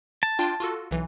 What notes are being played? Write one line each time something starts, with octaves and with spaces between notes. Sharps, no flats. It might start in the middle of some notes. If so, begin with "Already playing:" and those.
A5
D4 F4 G5
F4 F#4 A4
B1 E3